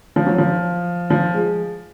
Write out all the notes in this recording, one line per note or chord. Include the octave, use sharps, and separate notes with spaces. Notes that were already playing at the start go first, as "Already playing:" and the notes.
F3
F#3
F3
F3
G#3